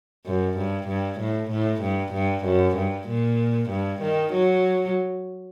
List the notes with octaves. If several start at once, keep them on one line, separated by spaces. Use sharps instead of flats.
F#2
G2
G2
A2
A2
G2
G2
F#2
G2
A#2
G2
D#3
F#3